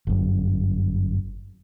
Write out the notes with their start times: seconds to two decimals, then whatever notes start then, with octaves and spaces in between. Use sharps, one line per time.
0.07 G1 F#2